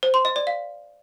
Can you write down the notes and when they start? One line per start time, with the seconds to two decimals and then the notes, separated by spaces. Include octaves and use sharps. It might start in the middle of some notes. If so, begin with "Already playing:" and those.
0.03 C5
0.14 C6
0.25 D#5
0.36 D5
0.47 F5